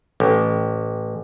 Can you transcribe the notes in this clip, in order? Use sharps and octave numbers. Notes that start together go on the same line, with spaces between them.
A1